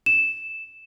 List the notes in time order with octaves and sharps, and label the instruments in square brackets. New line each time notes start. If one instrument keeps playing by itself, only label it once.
[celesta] E7